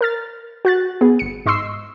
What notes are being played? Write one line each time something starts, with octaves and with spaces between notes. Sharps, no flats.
A#4 F6 A6
F#4 F#6 A6
B3 G#4
G1 C#7
G#2 D#5 C6 C#6 E6 C7